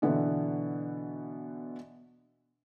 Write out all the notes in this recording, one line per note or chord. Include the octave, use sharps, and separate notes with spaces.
B2 D3 E3 B3